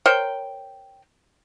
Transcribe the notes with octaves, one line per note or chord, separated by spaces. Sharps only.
A#4 C5 C#5 G5